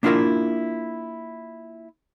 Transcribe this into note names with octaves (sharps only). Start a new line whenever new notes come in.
A#3 D4 E4 F4 A#4 E5